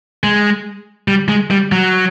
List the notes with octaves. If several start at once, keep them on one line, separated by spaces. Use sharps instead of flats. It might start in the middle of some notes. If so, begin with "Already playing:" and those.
G#3
G3
G#3
G3
F#3